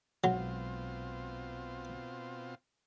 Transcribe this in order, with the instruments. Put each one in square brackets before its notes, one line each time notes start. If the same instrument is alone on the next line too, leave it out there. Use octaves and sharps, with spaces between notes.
[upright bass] B1 G#3 [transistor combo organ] B2 C4 F4 [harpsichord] F#3